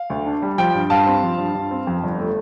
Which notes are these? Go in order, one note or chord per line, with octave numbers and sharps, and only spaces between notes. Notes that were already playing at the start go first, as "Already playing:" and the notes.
Already playing: F5
D2
D4
G3
F3 G5
G2
G2 F5 A5
C4
F3
G2
G2
C4
F2
G1
A3